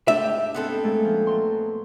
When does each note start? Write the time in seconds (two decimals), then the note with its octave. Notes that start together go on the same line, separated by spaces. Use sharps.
0.08 G#2 A3 D4 G4 E5
0.54 B3 C4 A4
0.83 A#2 G#3 A3
1.04 F3 C#4
1.27 F#3 C6